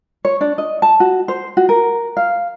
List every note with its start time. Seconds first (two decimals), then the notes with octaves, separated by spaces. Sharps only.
0.25 C#5
0.41 D4
0.58 D#5
0.82 A5
1.00 F#4
1.28 C5
1.57 F#4
1.69 A#4
2.17 F5